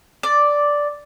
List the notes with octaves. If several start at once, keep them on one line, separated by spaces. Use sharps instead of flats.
D5